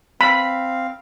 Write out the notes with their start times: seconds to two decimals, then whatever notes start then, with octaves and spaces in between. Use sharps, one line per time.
0.21 C4 F5 B5